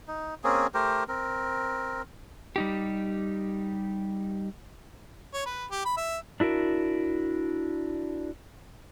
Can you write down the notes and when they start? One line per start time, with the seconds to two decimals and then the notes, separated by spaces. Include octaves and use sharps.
0.08 D#4
0.44 A#3 C4 C#4 G#4
0.74 A3 G4 A#4 C5
1.08 C4 A#4
2.56 G3 D#4 G4
5.34 C#5
5.46 B4
5.70 G4
5.85 B5
5.97 E5
6.40 D4 E4 F#4 A#4